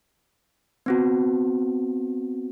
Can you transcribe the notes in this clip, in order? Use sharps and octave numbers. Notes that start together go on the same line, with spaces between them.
B3 C4 F#4